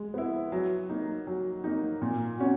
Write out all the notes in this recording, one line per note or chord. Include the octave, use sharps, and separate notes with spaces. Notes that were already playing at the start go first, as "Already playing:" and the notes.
Already playing: G#3
B3 E4
F#3
A#3 D#4
F#3
A#3 D#4
A#2
C#4 F#4